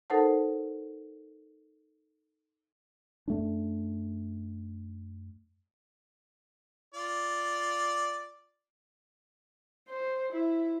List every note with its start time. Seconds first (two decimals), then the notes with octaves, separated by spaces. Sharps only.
0.10 D#4 A4 A#4 C5 F#5 A5
3.28 F#2 A3 D4
6.94 F4 D5
9.88 C5
10.33 E4